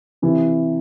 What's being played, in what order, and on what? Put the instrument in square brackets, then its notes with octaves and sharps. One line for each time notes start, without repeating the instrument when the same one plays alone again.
[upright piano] C3 E3